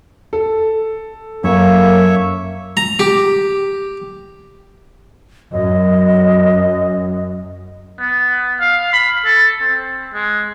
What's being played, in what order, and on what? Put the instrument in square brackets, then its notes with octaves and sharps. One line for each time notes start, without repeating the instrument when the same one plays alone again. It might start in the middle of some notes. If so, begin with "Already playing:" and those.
[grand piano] A4
[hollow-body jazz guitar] F#2 [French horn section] A#3 [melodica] C#5 E5
[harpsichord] A#5
G4
[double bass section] F#2 [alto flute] D#5
[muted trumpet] B3
F5
B5
A4
C4
G#3